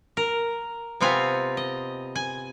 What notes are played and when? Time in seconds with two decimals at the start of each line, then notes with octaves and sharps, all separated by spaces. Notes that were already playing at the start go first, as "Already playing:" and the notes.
0.17 A#4
1.01 C3 B3 C4 F4 G#5
1.57 D#5
2.15 G#5